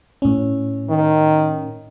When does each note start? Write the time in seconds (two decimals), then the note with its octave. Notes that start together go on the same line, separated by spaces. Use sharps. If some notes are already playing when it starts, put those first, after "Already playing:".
0.22 A2 C#4
0.89 D#3